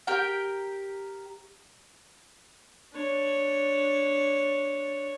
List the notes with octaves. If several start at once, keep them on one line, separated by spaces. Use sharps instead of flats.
G4 A#4 G5
D4 C#5